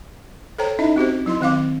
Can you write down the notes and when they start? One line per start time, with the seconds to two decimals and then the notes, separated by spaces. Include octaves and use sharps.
0.58 A4 C5 C#5 G5 A#5
0.79 C#4 D#4 E4 D#5 E5
0.96 C4 F#4 G4 C5
1.26 F#3 E4 D#5 C6
1.41 D#3 C4 F5 D6